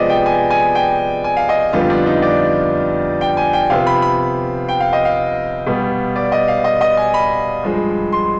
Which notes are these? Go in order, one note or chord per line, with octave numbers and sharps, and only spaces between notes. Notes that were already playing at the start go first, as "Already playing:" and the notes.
Already playing: C3 F3 G#3 B3 D5 D#5
G5
G#5
G#5
G5
G#5
F5
D#5
F2 D3 G3 B3 F4
D4
D#4
D5
G5
G#5
G5
C3 F3 B3 F5
B5
B5
G5
F5
D#5
F5
B2 G3 B3
D5
D#5
F5
D#5
D#5
G#5
B5
G2 F3 G#3
C6